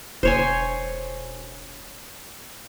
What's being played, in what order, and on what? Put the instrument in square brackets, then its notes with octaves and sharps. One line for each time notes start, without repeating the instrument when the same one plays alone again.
[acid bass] E1 [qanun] C5 C#5 G#5